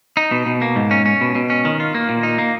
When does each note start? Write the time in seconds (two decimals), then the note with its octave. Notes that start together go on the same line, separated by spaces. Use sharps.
0.17 D#4
0.31 B2
0.46 B2
0.62 A#3
0.76 G#2
0.91 C#4
1.06 C#4
1.21 B2
1.35 B2
1.50 C#4
1.65 D#3
1.80 F4
1.95 A#3
2.09 A#2
2.23 D#4
2.38 A#3